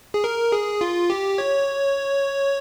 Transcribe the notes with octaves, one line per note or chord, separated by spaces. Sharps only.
G#4
A#4
G#4
F4
G4
C#5